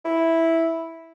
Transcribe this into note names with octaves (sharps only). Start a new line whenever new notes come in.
E4